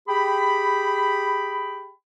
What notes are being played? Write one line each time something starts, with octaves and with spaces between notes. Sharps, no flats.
G4 G#4 G5 B5